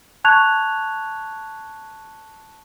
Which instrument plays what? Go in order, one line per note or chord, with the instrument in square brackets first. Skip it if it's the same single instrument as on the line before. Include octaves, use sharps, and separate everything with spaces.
[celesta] A5 C#6 F#6 G#6 F7